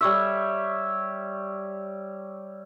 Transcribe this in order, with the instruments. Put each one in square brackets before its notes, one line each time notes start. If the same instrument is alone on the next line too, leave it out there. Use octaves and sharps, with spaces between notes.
[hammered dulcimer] G3 C#5 E5